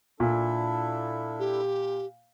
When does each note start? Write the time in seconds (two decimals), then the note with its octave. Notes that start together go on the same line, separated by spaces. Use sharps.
0.20 A#2 D4 E4 A4
1.39 G4